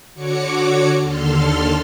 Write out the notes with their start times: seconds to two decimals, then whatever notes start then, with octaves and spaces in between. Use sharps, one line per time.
0.14 D3 F#4 C#5 D6 C#7
0.99 D#2 D3 A4 C6 F6